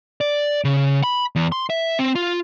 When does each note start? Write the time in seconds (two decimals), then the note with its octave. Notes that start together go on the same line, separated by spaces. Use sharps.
0.21 D5
0.64 C#3
1.04 B5
1.36 E2
1.52 C6
1.70 E5
1.99 C4
2.15 F4